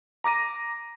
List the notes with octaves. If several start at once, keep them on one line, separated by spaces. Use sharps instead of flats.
A#5 D6 A#6 D#7